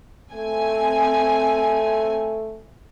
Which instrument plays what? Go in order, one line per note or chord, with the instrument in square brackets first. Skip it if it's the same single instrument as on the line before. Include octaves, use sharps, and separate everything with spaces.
[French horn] A3 [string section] C4 G#5